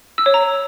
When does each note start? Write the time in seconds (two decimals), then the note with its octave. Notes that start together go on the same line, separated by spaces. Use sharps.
0.18 E6
0.26 C#5
0.34 A#5